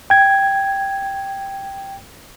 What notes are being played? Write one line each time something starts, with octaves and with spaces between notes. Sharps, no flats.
G5 G#6